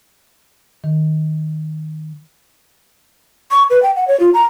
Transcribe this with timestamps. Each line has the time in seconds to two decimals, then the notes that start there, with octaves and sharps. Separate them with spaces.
0.84 D#3
3.51 C#6
3.70 B4
3.83 G5
3.96 F#5
4.08 C#5
4.20 F4
4.34 A#5